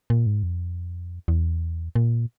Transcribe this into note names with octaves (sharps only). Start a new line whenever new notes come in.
A#2
G#2
F2
E2
A#2